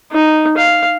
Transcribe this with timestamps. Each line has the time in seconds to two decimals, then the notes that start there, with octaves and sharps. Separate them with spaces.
0.12 D#4
0.57 F5